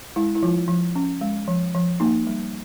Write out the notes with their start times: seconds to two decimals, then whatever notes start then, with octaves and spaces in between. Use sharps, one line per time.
0.16 G#3 E4
0.35 E4
0.43 F3 F4
0.68 F3
0.95 C#4
1.21 G#3
1.48 F3
1.75 F3
2.00 A#3 D#4
2.27 G3